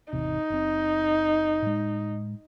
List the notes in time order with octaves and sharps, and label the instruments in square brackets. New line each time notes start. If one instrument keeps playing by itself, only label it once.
[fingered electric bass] G#1 E2 C3 [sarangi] D#4
[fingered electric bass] F#1 C4
A2 G#3